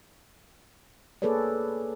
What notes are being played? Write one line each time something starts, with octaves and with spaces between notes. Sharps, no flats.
A#3 G#4 A4 B4 C#5 D5